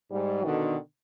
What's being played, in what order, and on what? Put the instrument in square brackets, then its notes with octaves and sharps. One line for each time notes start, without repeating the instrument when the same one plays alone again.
[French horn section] G#2 [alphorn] G3
[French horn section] B2 D3 [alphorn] D#3